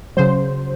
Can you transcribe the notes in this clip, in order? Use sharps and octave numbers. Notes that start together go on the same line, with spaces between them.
C#3 F#3 C5